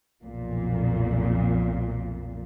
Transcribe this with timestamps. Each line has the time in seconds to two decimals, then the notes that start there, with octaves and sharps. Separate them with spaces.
0.23 B1 F2 A#2